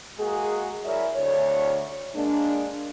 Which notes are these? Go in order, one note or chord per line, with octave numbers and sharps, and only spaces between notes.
G#3 A#3 F#4 G#4
F#3 E4 G#4 A#4 D5 E5
D2 D3 C#5
G#3 A#3 D4